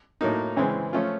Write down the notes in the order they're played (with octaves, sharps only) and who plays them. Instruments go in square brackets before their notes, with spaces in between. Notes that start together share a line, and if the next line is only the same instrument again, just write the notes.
[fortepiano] A2 F#3 A#3 D#4
C#3 E3 G#3 C4
F3 A3 C#4 F4